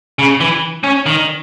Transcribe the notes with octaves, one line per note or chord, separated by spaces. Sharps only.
C#3
E3
C#4
D#3